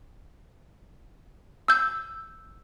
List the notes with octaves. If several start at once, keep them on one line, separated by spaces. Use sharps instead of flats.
E6 G6